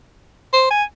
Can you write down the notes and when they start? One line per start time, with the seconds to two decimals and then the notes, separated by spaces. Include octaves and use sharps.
0.53 C5
0.71 G#5